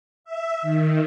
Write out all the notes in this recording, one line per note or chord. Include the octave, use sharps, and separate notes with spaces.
E5
D#3